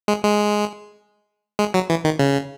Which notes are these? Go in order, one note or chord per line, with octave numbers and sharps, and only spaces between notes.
G#3
G#3
G#3
F#3
E3
D#3
C#3